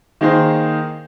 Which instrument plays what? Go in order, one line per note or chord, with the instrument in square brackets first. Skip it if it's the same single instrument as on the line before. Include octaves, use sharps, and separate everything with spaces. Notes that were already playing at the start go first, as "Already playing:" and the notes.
[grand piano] D#3 A#3 D#4 G#4 C5